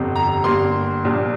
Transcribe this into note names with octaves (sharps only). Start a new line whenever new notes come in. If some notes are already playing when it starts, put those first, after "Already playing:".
Already playing: G1 F2 C3
A#5
G1 G2 G3 A#3 C6
A#1 A#2 G3 A#3